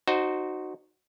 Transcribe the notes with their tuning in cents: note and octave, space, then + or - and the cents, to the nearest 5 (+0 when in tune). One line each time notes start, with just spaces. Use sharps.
D#4 -25 F#4 +0 C5 +0